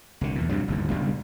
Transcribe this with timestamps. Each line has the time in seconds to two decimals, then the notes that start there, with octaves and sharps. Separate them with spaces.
0.21 C2 D3
0.36 E2 A#2
0.49 G2 C3 F#3
0.68 G1 D#2 A2
0.91 C#2 G2 B2 G3